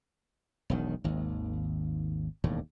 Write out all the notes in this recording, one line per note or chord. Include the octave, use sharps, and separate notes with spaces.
E1 B1 D#3
G#1 D#2
E1 D#2 A2